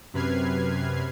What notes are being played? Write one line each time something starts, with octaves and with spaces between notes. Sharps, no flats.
F#2 C3 B4 F6 G#6 C7